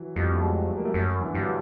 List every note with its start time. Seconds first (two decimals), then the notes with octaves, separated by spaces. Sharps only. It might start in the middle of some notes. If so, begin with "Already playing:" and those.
Already playing: E3 F#3
0.16 F2 F3 G3
0.35 A3
0.42 F#3 G#3
0.69 A3
0.77 A#3
0.85 G3 A3
0.94 F#2
1.21 D3 E3
1.33 G2 G3
1.41 F#3